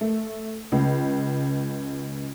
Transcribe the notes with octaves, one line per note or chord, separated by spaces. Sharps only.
A3
C#2